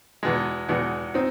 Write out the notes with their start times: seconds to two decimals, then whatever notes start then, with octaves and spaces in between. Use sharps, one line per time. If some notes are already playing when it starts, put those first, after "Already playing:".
0.23 E2 B2 G#3
0.69 E2 B2 G#3
1.14 C4 D#4